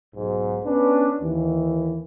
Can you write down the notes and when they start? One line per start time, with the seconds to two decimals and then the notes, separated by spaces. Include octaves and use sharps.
0.14 B1 G#2
0.64 B3 C#4 D4 B4
1.20 D#2 E3